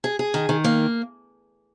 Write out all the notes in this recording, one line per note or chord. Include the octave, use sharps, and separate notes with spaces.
G#4
G#4
D#3
D#3
A#3